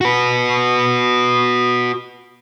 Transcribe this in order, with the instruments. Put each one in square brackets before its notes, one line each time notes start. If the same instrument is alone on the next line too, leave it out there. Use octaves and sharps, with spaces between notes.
[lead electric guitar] F#4 B4